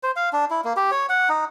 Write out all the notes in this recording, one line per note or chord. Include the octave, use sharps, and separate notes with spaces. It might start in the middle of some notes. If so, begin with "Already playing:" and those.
C5
F5
D4
E4
A#3
G4
C#5
F#5
D#4